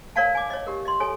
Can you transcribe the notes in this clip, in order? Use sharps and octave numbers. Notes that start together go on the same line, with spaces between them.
A#4 C#5 D5 F5 F#5 A5
G#5 D6
C#5 D#5
G4 A#4
D#5 C6
A4 C#5 G#5